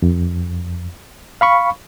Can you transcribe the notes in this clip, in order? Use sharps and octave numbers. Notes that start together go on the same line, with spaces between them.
F2
F5 B5 C#6